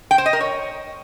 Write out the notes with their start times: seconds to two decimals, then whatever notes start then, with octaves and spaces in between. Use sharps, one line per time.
0.11 G5
0.18 C5
0.26 D#5
0.33 A#4
0.41 C#5